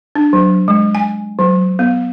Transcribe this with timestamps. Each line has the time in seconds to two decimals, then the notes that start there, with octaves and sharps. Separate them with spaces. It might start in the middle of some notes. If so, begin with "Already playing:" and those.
0.15 D4
0.33 F#3
0.68 G#3
0.95 G#5
1.39 F#3
1.79 B3